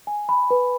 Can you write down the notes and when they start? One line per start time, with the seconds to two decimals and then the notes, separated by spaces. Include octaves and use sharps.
0.07 G#5
0.29 B5
0.51 B4